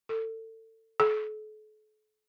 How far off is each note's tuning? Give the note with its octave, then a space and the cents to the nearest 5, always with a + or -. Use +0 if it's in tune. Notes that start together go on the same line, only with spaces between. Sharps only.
A4 +30
A4 -40